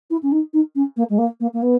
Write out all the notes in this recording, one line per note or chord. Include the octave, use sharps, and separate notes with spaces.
E4
C#4
D#4
D#4
C#4
A#3
G#3
A#3
A#3
A#3
B3